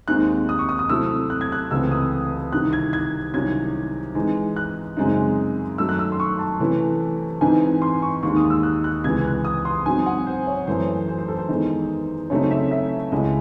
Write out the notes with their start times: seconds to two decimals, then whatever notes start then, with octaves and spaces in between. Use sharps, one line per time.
0.08 D#2 D#3 G#3 C4 D#4 F#6
0.49 D#6
0.59 C#6
0.69 D#6
0.79 D#6
0.89 C3 F#3 A3 C4 E4 E6
1.30 F#6
1.41 G#6
1.52 F#6
1.71 C#2 C3 E3 A3 C4 E6
1.91 D#6
2.52 C2 C3 D#3 F#6
2.73 G#6
2.93 G#6
3.34 C2 C3 D#3 F#3 C#4 G#6
4.15 G#2 E3 G#3
4.56 F#6
4.97 F#2 C#3 G#3 C4 D#4
5.78 F#2 D#3 F#3 A3 D#4 E6
5.89 F#6
5.99 E6
6.12 C6
6.20 C#6
6.39 A5
6.60 C3 E3 A3 C#4 E4
7.41 G#2 E3 C4 D#4 G#5
7.82 C6
8.02 C#6
8.23 D#2 D#3 G#3 D#4 C#6
8.37 D#6
8.50 E6
8.63 F#6
8.84 F#6
9.04 C#2 C3 E3 G#3 G#6
9.25 F#6
9.45 D#6
9.65 C6
9.86 G#2 F#3 C4 G#5
10.06 F#5
10.26 C5
10.47 C#5
10.67 F#2 E3 A3 C5
11.08 C5
11.18 C5
11.28 A4
11.38 C5
11.48 E2 D#3 G#3 D#4
12.30 C#3 F#3 A3 C4 D#4 C#5
12.51 E5
12.71 E5
13.12 C#2 C#3 G#3 C#4 E4 D#5